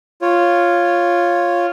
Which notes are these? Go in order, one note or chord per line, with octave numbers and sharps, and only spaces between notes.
F4 C#5